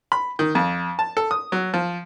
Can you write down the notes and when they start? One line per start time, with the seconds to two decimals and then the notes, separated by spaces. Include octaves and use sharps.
0.12 B5
0.39 D#3
0.55 F2
0.99 A5
1.17 A4
1.31 D#6
1.52 F#3
1.74 F3